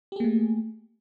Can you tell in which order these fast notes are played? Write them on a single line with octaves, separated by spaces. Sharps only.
G4 G#4 A#3 A3